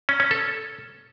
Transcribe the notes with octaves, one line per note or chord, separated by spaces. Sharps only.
C#4
C#4
A4